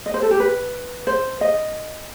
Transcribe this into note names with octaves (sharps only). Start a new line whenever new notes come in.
D#5
C5
A4
G4
B4
C5
D#5